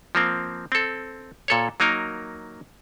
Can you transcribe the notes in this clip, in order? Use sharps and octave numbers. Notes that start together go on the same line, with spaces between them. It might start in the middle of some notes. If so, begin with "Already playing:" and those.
F3 A#3 C4
C4 A4
A#2 A4 C#5
F#3 A#3 D#4 A#4